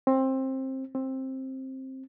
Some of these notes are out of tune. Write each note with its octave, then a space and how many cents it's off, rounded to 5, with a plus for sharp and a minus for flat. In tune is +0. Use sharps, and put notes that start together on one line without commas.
C4 +20
C4 +15